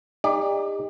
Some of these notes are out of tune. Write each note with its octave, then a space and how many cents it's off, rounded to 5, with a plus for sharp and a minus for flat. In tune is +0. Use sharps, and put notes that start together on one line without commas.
D#4 +0 G4 +40 D5 +0